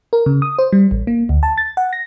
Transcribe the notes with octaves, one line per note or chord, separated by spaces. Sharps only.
A#4
C#3
D#6
C5
G3
A1
A#3
D2
A5
A6
F#5
A#6